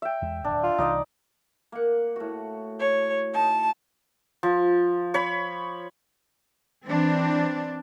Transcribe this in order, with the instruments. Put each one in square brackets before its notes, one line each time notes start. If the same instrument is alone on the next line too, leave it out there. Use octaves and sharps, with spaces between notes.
[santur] E5 G5
[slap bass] E2 G#3
[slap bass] D1 C#2 [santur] D4
[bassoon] F4
[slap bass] C2 E3 [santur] D#4 D5 D#5
[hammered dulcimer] A#3 F#5
A2 F#4
[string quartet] C#5
[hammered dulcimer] D#4 [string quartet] A5
[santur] F3
C#5 B5
[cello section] E3 C4 D4